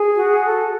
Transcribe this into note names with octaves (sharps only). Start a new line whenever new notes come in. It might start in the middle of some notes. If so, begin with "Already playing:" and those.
Already playing: G#4
F#4
A4